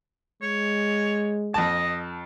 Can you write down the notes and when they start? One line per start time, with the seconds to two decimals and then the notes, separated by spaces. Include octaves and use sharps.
0.42 G#3 C#5
1.54 F2 D#5 A5